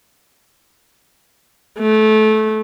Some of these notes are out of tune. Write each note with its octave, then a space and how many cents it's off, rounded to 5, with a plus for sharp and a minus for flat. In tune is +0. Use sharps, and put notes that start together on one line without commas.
A3 -20